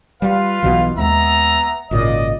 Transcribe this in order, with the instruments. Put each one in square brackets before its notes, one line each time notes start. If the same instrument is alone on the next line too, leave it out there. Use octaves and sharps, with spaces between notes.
[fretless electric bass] G3 [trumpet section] F4 B4 F5
[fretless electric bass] B1 B2 E3
[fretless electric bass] D#2 G3 G#3 [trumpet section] B3 E5 A#5
[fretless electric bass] G#1 A#2 C#3 [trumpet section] D5 D#5